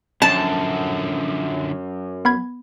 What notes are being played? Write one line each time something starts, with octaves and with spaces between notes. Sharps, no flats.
F#2 D3 F3 A5
B3 B5 G#6